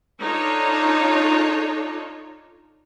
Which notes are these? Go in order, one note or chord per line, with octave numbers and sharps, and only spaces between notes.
D4 D#4 F4 A4 C#5